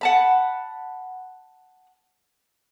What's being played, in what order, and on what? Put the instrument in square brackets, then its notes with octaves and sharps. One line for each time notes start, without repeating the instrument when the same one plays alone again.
[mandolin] F#5 A5 B5